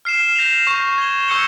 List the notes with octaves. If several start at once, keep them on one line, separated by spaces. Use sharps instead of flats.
F6 C7 E7
G6 A#6 F7
C#6 G6 C7 E7
G#6 E7 G7
C#6 E6 G6 C#7 G7